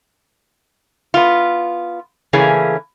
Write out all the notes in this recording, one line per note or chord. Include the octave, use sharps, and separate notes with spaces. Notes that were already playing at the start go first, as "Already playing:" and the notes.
B3 F4
C#3 E3 A3 A#3 C#4 G#4